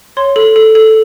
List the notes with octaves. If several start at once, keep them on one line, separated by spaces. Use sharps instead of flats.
C#5 C6
A4
A4
A4